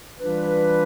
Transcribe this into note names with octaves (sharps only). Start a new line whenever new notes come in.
E3 G3 D4 F4 B4